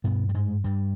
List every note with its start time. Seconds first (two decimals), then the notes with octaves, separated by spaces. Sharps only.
0.04 G2 B2 B3
0.29 G3
0.34 G#2 G#3
0.64 G2 G3